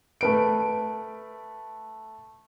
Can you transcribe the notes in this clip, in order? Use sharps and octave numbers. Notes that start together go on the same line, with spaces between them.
A3 B4 D7